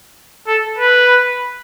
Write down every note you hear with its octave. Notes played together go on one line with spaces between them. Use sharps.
A4
B4